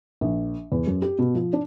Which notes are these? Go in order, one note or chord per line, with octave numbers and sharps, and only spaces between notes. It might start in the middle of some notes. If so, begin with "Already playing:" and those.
A#1
E2
F#2
G4
B2
F3
D4